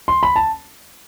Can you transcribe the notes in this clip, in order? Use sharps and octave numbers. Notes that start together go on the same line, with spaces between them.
C6
B5
A5